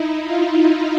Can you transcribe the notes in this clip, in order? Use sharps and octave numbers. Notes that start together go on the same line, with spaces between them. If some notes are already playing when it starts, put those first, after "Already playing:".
Already playing: D#4 E4
F4
D#4